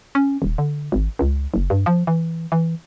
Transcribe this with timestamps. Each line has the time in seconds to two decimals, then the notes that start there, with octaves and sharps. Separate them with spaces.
0.15 C#4
0.42 D#1
0.58 D3
0.92 G#1
1.19 C#2
1.54 F#1
1.70 G2
1.86 F3
2.07 E3
2.52 E3